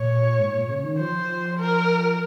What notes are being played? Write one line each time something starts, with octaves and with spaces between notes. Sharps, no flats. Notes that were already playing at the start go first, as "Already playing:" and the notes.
Already playing: A#2 C#5
G#2
A#2
C#3
D#3
F3 C5
A#4